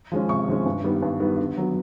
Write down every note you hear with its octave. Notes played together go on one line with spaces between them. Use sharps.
F3 G#3 C#4
C3 C#6
F3 G#3 C#4
G2
D#3 G3 B3
G2
D#3 G3 B3
D3
F#3 B3